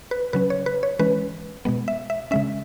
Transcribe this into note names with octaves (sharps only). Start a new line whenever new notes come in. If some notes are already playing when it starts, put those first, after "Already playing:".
B4
C#3 F#3 C#4 B4
C#5
B4
C#5
E3 G#3 C#4 B4
B2 G#3 B3
E5
E5
C#3 G#3 C#4 E5